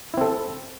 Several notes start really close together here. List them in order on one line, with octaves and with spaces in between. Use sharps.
E4 C4 A4